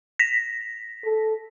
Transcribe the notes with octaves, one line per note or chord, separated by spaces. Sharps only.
A#6 B6
A4